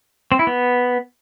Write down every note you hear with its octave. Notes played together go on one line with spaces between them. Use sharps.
C4
E4
B3